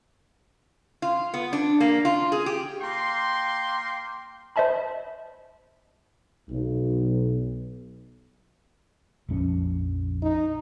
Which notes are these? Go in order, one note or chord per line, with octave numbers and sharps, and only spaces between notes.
F4
B3
D4
A#3
F4
G#4
G4
A#3 G5 C6
C5 D#5 E5 A5 B5
B1
A#1 F2 C#4
D#4